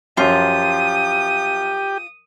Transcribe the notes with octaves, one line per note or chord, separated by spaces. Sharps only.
F#2 F3 F#3 F4 G4 D#6